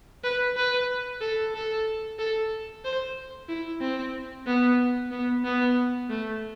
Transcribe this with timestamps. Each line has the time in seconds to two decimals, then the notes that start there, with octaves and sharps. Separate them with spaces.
0.24 B4
0.57 B4
1.21 A4
1.54 A4
2.19 A4
2.85 C5
3.49 E4
3.81 C4
4.47 B3
5.11 B3
5.44 B3
6.10 A3